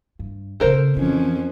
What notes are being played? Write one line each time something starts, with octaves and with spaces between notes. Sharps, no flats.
G2
A#2 C#3 A4 A#4 C5
F2 E3 C#4